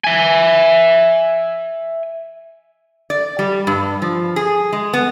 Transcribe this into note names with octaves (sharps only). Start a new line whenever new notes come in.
E5 G#5
D5
G3
G2
F3
G#4
G#3
B3